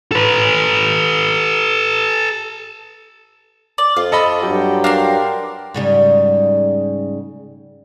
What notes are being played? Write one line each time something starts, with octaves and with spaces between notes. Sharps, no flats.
A4 B4
D5
F2 F4
A4 D#5 B5
G2 F#3 G4 G5
D4 A#4 F5 C6
G#2 C#3 G3